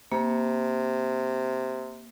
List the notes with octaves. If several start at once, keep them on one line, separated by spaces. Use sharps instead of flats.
C3 A#3